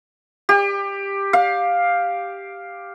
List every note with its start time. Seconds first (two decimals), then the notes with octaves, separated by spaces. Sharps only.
0.49 G4
1.33 F5